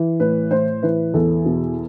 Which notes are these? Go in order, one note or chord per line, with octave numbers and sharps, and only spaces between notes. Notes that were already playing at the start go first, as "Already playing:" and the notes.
Already playing: E3
A2 B4
A2 C5
E3 B4
E2 A4
B2